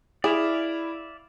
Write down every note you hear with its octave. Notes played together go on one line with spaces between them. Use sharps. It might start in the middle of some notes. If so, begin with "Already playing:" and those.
E4 G#4 D5 E5 F5